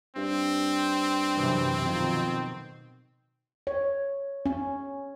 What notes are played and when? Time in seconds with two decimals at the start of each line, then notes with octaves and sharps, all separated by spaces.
0.17 G2 C4
1.35 F#2 C3 E3
1.85 F2 B2 D#3
3.67 C#5
4.46 C#4